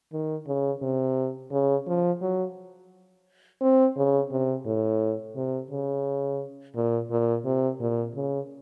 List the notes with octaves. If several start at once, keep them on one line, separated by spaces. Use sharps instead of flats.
D#3
C#3
C3
C#3
F3
F#3
C4
C#3
C3
A2
C3
C#3
A#2
A#2
C3
A#2
C#3